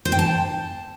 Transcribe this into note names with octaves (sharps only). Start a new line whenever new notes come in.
C5
G5
A5